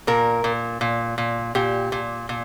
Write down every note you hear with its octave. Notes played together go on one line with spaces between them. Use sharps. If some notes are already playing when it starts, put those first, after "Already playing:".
A#2 A#4
A#2
A#2
A#2
A#2 G4
A#2
A#2